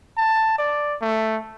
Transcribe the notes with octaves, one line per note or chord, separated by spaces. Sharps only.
A5
D5
A3